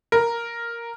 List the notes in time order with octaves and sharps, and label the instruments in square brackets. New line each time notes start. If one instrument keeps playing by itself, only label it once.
[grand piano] A#4